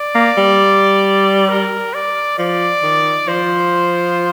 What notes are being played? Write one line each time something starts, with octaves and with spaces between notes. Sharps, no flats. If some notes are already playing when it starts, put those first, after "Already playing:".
Already playing: D5
A#3
G3
A#4
D5
F3 D5
D#3
F3 C5